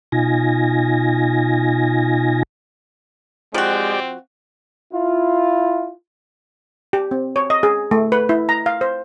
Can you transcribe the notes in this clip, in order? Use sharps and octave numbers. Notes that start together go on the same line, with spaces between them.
B2 D#4 F4 G#5 A#6
F3 G#3 C4 F#4 G4 D5
E4 F4
G4
C4
C#5
D#5
G#4
A3
B4
E4
A#5
F5
C5